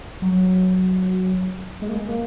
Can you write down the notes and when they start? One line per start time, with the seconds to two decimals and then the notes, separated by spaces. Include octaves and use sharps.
0.22 F#3
1.82 G#3
1.89 A#3
1.96 G#3
2.08 A#3